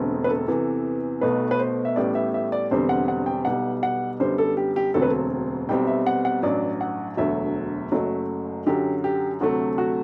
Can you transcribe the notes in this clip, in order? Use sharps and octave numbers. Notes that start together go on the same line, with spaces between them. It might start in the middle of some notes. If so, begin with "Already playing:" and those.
Already playing: E1 E2 D3 A3 C4
B4
A4
E2 C3 E3
B1 B2 A3 B4
B4
C5
E5
A1 A2 G3 B3 D5
E5
E5
D5
E1 E2 D3 G3 C4 C5
F#5
F#5
G5
B1 B2 G3 F#5
F#5
F#2 D3 G3 B3 C5
A4
G4
G4
E1 D2 D3 F#3 C4 A4
B4
A4
B1 B2 G3 C4 G5
E5
F#5
F#5
A1 G2 F#3 D5
F#5
E1 D2 D3 F#3 E5
F#1 F#2 F#3 A3
F#2 D3 F#3 G4
G4
D2 C3 F#3 A3 F#4
F#4